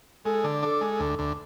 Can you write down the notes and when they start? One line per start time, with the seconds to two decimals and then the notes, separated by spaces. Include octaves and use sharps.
0.25 G#3 A4
0.44 D3
0.63 D4 A4
0.81 G#3
1.00 D2
1.19 D2